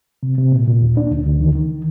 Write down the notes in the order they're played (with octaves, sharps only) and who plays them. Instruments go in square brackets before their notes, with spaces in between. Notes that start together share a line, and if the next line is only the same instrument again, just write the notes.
[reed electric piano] C3
C3
A#2
A#2
D#2
D4
D2
D2
D#3
D#3